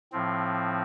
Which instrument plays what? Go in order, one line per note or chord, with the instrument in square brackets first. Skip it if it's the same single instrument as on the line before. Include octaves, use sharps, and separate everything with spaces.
[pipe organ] A2 F3 C4